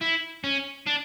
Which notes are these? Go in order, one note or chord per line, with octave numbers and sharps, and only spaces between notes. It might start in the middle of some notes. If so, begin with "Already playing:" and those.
E4
C#4
D4